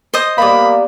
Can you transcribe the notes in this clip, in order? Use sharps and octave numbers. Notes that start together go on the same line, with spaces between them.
C5 D#5 D#6
G3 A#3 B3 A#4 B5